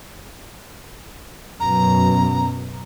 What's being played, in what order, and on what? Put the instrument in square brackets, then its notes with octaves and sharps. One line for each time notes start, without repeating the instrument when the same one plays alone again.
[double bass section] F#2 B2 [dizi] A#5